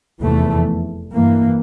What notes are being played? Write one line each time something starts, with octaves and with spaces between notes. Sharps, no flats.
F1 E2 E3 A3
G2 E3 A#3